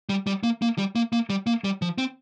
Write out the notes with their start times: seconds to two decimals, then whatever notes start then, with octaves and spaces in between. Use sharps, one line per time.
0.09 G3
0.27 G3
0.43 A#3
0.62 A#3
0.78 G3
0.95 A#3
1.13 A#3
1.30 G3
1.47 A#3
1.64 G3
1.82 F3
1.98 C4